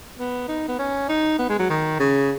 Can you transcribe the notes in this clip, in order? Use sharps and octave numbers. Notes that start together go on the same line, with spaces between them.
B3
D#4
B3
C#4
D#4
B3
G#3
F#3
D#3
C#3